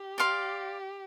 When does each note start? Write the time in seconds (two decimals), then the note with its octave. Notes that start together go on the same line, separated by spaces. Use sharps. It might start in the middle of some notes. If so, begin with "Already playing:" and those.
Already playing: G4
0.18 D5 F5 C6